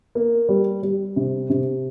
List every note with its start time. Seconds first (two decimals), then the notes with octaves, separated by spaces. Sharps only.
0.15 A#3
0.49 G3
0.83 G3
1.16 C3
1.50 C3